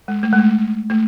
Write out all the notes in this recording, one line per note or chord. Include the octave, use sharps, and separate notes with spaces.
G#3
A3
G#3
A3
A3